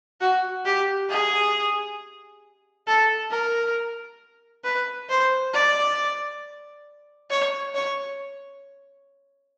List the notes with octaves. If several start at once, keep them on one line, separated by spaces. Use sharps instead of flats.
F#4
G4
G#4
A4
A#4
B4
C5
D5
C#5
C#5